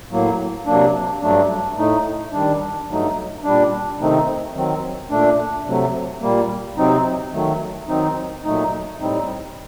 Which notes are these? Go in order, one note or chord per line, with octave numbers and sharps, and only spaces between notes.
A2 F#3 A#3
C3 F#3 A#3 D4
G2 F#3 A3 D4
A2 A3 D#4
D#3 G3 D4
G2 F#3 A3 D#4
A#2 G3 D4
C3 D#3 A3 C4 D#4
D#3 F#3 C4
A#2 A3 D4
C3 F#3 A3
A#2 G3 A#3
C3 F#3 C4 D#4
D#3 F#3 A3
D#3 F#3 C4 D#4
A#2 F#3 A3 D#4
A2 G3 C4 D#4